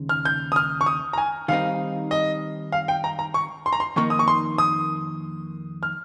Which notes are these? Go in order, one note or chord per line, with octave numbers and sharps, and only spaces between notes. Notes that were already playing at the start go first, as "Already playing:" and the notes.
Already playing: D#2 C#3 G#3
F6
G6
D#6
F6
C#6
D#6
A#5
G#5
D#3 G3 C4 D#4 F5
D#5
F5
G5
A#5
A#5
C#6
C6
A#5
C6
F2 D#3 A#3 D#4 C#6
D#6
C#6
C6
D#6
F6